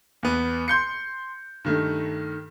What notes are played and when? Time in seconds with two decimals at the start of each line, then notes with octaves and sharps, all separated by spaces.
0.23 E2 B3
0.68 C6 G6 C#7
1.65 G2 D#3 A3